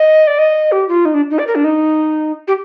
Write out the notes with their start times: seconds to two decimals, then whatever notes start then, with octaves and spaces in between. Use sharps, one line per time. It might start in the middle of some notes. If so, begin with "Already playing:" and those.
Already playing: D#5
0.27 D5
0.39 D#5
0.72 G4
0.89 F4
1.05 D#4
1.14 D4
1.31 D#4
1.39 D5
1.47 A#4
1.55 D4
1.64 D#4
2.48 G4